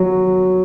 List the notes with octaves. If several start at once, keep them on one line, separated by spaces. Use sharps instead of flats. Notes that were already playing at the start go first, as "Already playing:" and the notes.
Already playing: F#3